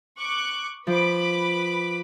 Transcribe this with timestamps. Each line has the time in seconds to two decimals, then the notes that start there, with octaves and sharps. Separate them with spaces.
0.17 C#6 D6 F#6
0.87 F3 B4 C5 B5 D6